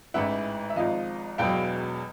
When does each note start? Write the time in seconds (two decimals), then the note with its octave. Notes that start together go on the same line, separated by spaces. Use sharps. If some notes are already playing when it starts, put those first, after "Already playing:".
0.14 A1 G#2 E3 E5 F#5
0.70 E5
0.76 G#1 G#2 F3 D#5 F5
1.38 E1 E2 B2 F#3 F5 G5